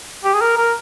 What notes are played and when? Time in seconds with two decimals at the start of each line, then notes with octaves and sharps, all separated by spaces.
0.24 G4
0.33 G#4
0.41 A#4
0.58 A#4